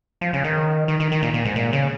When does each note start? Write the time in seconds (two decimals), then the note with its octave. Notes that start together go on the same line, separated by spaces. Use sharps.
0.21 F3
0.33 C#3
0.44 D#3
0.88 D#3
1.00 D#3
1.12 D#3
1.22 A#2
1.34 A#2
1.45 G#2
1.56 A#2
1.73 C#3